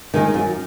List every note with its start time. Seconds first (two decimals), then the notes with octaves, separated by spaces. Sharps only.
0.14 D#3 G#3 D#4
0.34 F#2